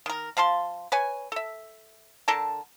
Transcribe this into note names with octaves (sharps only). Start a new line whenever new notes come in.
D#3 A#4
F3 F5 A5 C6
B4 C#5 G#5
A4 E5
D3 A4 A#4 A5